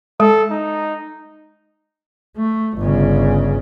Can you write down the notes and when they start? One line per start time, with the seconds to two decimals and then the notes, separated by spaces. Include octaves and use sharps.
0.20 G#3 A4
0.50 D#4
2.37 A3
2.78 G1 C#3